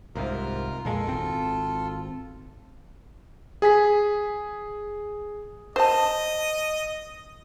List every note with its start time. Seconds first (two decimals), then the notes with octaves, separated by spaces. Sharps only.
0.15 C2 G#2 C3 F4 A#4
0.85 F2 A#2 G#3 F4 A4
1.07 G#1 C4
3.62 G#4 G#5 B6
5.76 C5 D#5 A5